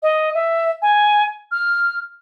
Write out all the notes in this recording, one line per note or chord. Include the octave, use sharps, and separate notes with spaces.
D#5
E5
G#5
F6